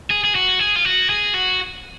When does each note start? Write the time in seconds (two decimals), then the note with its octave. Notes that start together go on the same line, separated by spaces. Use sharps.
0.10 G#4
0.24 G#4
0.35 F#4
0.59 G#4
0.76 F4
0.85 F#4
1.10 G#4
1.34 F#4